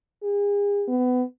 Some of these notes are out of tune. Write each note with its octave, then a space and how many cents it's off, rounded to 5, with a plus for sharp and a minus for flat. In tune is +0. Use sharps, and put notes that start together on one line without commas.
G#4 -40
B3 +25